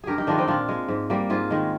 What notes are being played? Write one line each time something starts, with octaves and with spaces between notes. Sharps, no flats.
G2 G4 G#4 A#4
D#4 G4
D#3 G#3 D4 F4
C4 D#4
A#2 D4 F4
G#3
G#2
G3 A#3
G#2 F4 G#4
D#3 G#3